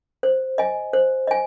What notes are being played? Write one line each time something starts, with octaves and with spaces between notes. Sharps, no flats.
C5
D#5 G#5
C5
D#5 G#5